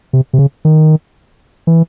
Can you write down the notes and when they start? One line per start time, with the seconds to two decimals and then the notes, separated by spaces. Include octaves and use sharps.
0.13 C3
0.33 C3
0.39 C#3
0.65 D#3
1.67 E3